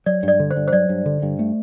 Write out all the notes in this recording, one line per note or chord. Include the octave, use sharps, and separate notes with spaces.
F#3 D5
G2 D5
D3
C5
G2
C5
F#3 D5
G2
D3
G2
A3